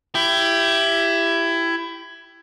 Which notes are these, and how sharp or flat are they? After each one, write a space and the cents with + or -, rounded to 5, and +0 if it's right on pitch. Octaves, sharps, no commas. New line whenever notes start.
E4 +20 G4 +0